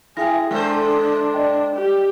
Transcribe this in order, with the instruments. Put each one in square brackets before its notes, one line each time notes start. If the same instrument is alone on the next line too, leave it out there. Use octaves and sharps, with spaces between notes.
[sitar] E4 [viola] G#4 [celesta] G5 G#5 A#6
[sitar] G#3 A4 C5 [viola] D4
[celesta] D5 D#5 G5
[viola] G4